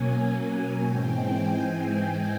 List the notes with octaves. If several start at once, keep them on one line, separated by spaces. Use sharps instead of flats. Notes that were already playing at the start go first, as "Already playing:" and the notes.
Already playing: B2 F#3 A#3 C#4 G#5
G#2 E3 G#3 C4 G5
G#5